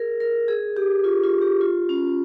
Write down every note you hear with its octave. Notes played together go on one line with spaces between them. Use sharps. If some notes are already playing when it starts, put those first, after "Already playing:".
Already playing: G#4 A#4
A#4
G#4
G4
F4
F4
G4
F4
C#4